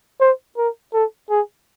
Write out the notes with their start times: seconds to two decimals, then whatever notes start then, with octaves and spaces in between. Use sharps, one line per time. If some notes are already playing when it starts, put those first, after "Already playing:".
0.21 C5
0.57 A#4
0.93 A4
1.30 G#4